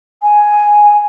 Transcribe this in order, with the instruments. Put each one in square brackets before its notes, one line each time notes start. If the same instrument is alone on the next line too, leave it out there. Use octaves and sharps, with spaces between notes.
[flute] G#5